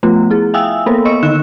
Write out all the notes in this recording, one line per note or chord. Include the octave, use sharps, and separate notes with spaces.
F3 A3 B3 F4
E4 G#4
E5 F5 G5 G#5 D#6 E6
A#3 B3 A4 A#4
B3 D#5 C#6 E6 C#7
D3 D#3 D#4 F#6 E7